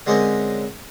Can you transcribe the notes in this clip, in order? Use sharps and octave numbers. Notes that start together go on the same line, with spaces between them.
D3 G#3 C4 C#4 A#4